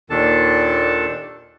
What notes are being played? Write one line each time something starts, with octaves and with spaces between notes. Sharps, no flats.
D#2 A#2 D#3 D4 A4 A5